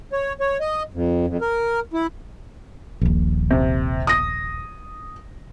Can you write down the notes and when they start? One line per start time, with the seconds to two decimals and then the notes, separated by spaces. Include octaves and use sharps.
0.13 C#5
0.41 C#5
0.60 D#5
0.94 F2
1.27 F2
1.41 A#4
1.93 E4
3.02 D#1 A#1
3.51 C3
4.07 D#6 A#6